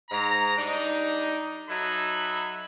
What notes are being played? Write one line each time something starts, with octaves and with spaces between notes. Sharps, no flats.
G#2 A#5
G3 D4 D#4
F#3 D#4 A4 E5 B5